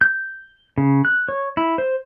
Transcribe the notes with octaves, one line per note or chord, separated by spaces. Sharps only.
G6
C#3
F#6
C#5
E4
C5